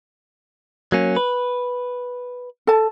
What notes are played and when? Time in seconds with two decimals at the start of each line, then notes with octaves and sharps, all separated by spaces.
0.92 F#3 A#3 C#4
1.16 B4
2.67 A4 A5